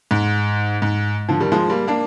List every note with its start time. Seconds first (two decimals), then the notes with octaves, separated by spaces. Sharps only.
0.11 G#2
0.82 G#2
1.29 D3 F3
1.40 D#3 G3
1.52 F3 G#3
1.69 G3 A#3
1.87 A#3 D4